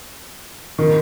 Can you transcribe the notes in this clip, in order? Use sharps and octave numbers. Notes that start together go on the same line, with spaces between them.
D#3